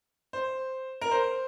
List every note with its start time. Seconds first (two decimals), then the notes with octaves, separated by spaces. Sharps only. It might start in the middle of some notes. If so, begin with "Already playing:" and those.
0.33 C5
1.01 A#4
1.11 C5